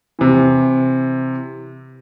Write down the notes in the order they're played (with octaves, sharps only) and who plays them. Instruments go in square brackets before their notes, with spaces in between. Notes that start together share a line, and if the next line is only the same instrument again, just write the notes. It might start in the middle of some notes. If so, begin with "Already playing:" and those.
[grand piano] C3 E3